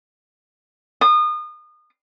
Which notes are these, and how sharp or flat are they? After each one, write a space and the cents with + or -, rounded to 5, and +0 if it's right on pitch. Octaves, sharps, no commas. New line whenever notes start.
D#6 -30